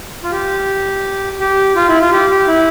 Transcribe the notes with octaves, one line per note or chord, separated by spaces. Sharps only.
F4
G4
G4
F4
E4
F4
G4
G4
E4